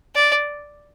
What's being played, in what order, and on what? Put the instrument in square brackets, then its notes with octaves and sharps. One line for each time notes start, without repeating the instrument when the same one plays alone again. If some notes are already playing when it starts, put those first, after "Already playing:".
[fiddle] D5